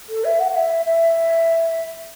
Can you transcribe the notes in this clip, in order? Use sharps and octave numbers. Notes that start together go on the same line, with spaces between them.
A4
E5
F#5
F#5
E5
E5